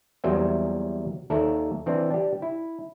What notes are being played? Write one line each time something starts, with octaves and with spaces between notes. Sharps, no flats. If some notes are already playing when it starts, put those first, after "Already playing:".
E2 F#3 G3 A#3 C5 E5
D#2 A4 A#4 D5 E5
E3 C4 D4
D4 G4
E4